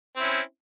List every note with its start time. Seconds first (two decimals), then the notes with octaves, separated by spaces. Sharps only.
0.16 C4
0.19 E4
0.22 C#4